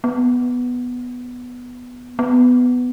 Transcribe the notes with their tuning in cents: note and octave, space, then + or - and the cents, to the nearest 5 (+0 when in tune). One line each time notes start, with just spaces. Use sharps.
B3 +0
B3 +10